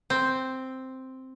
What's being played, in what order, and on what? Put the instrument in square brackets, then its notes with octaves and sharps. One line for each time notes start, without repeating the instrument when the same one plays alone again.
[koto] C4